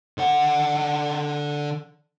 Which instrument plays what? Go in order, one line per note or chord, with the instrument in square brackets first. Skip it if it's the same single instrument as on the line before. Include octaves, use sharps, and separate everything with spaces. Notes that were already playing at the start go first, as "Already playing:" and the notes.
[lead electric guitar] D3 F#5